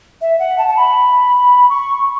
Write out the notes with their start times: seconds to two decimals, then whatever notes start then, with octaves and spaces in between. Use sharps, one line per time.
0.21 E5
0.39 F#5
0.58 A5
0.68 A5
0.77 B5
1.69 C#6